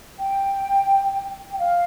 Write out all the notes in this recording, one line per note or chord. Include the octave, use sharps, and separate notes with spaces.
G5
G5
F5